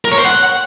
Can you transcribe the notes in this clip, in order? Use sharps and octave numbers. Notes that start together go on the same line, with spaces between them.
A#4
C#5
C5
F#5